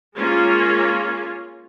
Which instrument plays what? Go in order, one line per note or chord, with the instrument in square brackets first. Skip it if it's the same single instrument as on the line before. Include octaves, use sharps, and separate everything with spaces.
[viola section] G#3 A#3 C#4 F4